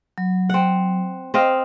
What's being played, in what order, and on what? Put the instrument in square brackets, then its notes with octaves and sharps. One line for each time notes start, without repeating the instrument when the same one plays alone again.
[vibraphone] F#3
[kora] C4 F#5
[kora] C4 D#5 F5 [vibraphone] C5